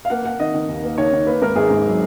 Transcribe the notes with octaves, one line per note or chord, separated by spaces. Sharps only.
F5
A#3 F#5
A#3 F#5
D#3 D#5
D#3
D#2
A#3
D#3 C#5
D#3
A#3 B4
G#2 A#4
G#1 G#4
G#2
F#3